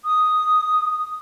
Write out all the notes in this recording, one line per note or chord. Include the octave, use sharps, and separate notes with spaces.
D#6